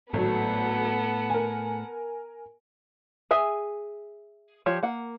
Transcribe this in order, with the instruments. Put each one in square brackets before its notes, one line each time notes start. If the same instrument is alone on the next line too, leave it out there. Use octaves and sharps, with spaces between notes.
[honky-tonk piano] G#1 F#3 [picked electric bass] A2 A3 [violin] B3 F#5 [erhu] A4
[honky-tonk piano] A#4 G#5
[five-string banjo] G#4 E5 G#5
F3 F4 G4 C#5
A#3 F#5